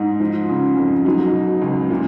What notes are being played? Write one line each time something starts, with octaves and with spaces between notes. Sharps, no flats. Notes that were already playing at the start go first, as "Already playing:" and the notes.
Already playing: G#2 D#4
F3
C#3
F2
F#3 D#4
B2
C#2
A#2